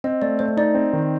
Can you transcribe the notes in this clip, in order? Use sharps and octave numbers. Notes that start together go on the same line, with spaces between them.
C4 D#5
A3 D5
A3 C5
D#4 D5
C4
D#3